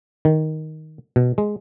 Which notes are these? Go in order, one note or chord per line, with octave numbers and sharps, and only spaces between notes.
D#3
B2
G#3